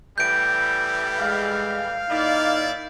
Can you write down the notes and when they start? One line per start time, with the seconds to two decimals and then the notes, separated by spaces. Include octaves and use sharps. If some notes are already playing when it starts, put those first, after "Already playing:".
0.18 A2 E3 G3 G6 D7
1.19 G#3 F5
2.10 A#2 D#4 E4 D5